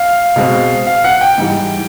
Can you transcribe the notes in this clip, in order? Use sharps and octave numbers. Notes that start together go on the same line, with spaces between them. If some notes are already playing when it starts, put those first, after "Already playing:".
Already playing: F5
B2 G#3 C4
F5
F#5
G5
G#2 E3 G3